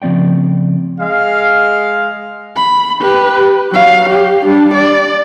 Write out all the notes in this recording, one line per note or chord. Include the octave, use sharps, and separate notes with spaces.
C#3 F3 C4 D5 G5
G#3 F5
B5
G4 B4
F#3 F5
G4
G3 D4
D5